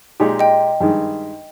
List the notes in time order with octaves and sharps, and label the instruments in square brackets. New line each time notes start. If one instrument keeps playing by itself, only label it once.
[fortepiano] A#2 G#3 D#4 G4
[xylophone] D#5 G5
[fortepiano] G2 D#3 G#3